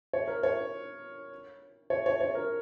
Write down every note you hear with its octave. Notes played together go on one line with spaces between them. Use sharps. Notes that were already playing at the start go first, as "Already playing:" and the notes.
C#5
A#4
C#5
C#5
C#5
C#5
A#4